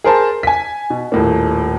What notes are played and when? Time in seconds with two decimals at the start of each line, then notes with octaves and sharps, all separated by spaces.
0.04 G#4 A#4 C5 A5
0.43 G#5 B6
0.90 B2
1.12 D#1 A2 A#3